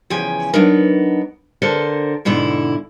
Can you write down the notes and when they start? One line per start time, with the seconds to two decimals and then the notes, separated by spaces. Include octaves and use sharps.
0.10 E2 C#3 F3 G5 G#5
0.54 F#3 B3 D4 D#4 A#4
1.62 D3 A4 A#4 C5
2.25 G#2 B2 D3 E4